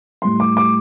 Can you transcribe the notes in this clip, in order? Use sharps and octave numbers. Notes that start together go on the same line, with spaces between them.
A2 G3 C6
D6
D6